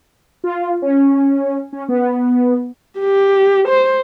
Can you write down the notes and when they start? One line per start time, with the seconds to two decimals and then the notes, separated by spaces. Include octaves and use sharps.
0.44 F4
0.82 C#4
1.73 C#4
1.88 B3
3.00 G4
3.68 C5